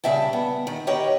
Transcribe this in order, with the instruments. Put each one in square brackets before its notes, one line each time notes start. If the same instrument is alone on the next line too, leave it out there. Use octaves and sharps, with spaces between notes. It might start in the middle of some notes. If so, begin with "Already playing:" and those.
[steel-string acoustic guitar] C#3 G3 E5 G5 A5
B3
D#3
G4 A#4 B4 C#5 D#5 G5